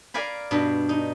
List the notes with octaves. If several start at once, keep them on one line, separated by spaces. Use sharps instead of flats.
A#4 D5 F5 G#5 B5
G2 B2 D4
D#4